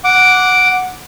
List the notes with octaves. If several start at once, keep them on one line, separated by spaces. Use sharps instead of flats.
F#5 D6